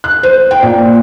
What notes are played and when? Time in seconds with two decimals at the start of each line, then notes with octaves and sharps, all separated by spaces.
0.04 F#6
0.23 C5
0.51 G5
0.62 A#2